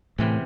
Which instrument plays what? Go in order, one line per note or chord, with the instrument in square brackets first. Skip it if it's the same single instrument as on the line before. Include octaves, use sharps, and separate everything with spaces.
[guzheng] E2 C3 E3 C4 [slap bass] A2